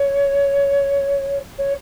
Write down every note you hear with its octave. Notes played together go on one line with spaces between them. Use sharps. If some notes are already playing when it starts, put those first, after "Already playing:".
Already playing: C#5
C#5